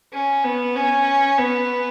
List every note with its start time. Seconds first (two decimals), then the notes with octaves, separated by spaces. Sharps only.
0.13 C#4
0.44 B3
0.76 C#4
1.38 B3